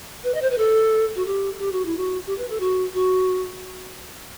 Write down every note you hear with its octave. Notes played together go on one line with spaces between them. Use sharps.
B4
D#5
C5
B4
A4
F#4
G4
G4
F#4
E4
F#4
G4
B4
A4
F#4
F#4